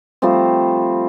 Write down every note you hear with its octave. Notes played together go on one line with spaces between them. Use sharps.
F3 G3 A3 C4